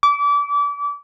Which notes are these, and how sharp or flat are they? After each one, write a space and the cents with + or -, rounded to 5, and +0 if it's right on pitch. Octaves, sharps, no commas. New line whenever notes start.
D6 -30